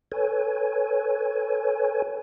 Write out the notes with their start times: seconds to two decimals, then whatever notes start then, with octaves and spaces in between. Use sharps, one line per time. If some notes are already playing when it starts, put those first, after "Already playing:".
0.12 A4 B4 C#5 G#5